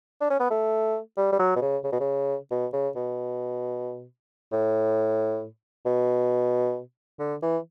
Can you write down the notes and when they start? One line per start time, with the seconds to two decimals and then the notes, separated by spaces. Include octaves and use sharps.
0.21 D4
0.30 C#4
0.40 B3
0.50 A3
1.17 G3
1.32 G3
1.39 F#3
1.56 B2
1.62 C#3
1.84 C#3
1.92 B2
2.00 C#3
2.51 B2
2.73 C#3
2.96 B2
4.52 A2
5.86 B2
7.19 D3
7.42 E3